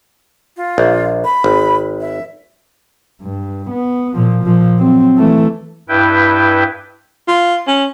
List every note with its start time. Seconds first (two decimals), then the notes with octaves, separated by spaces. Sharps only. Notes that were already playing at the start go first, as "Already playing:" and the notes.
0.57 F4
0.78 A#1
1.24 B5
1.44 G#1
2.00 E5
3.22 G2
3.71 B3
4.15 A#2 F3
4.44 A#2 F3
4.78 F#3 C4
5.17 E3 A3
5.89 G2 E4 B4 G5
7.28 F4
7.67 C#4